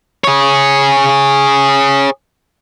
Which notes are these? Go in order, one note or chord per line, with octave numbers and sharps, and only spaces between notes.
G#4 C#5